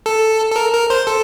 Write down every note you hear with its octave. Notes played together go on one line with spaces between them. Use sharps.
A4
A4
A#4
A#4
C5
A4